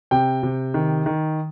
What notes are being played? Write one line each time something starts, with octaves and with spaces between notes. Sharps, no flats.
C3 G5
C3
D#3
D#3